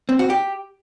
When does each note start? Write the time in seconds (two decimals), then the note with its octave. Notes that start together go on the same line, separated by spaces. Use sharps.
0.09 C4
0.19 F#4
0.30 G4